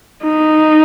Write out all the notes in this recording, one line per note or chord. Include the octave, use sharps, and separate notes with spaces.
D#4